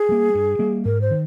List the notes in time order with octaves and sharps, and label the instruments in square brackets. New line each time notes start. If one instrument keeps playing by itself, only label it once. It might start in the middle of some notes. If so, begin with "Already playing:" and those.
Already playing: [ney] G#4
[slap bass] G3 A#3
G2
G3 A#3
[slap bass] G#2 [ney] A#4
[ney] C5
[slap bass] D#3